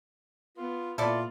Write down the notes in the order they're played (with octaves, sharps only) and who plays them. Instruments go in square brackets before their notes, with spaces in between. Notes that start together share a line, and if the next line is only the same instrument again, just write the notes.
[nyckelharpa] B3 [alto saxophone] F4
[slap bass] A#2 [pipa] E4 A4 D5 [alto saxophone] F4